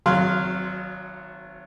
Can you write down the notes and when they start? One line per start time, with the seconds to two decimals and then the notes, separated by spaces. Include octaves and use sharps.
0.06 G#1 F#3 F5 C6 F6